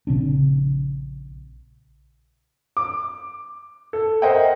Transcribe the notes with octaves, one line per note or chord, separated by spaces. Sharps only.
A#1 C#3 C4 D4
D6
A4
A#4 C5 D#5 E5 F#5 G5